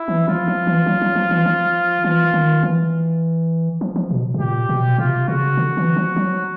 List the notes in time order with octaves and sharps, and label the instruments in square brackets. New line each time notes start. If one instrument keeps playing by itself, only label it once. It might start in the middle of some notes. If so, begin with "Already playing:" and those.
Already playing: [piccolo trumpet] E4
[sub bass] E3
[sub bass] F3 [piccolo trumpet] F4
[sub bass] F3
E3
F#3
F#3
F3
E3
F3
[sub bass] E3 [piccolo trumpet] F4
[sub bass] D#3
E3
F3
F3
B2
B2
[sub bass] A#2 [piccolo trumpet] G4
[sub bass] B2
[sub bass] C3 [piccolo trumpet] F4
[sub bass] C#3 [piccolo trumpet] F#4
[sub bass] D3
E3
F3
F#3